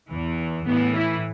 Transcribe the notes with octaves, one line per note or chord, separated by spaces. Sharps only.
E2 E3
A2 E3 B3
E4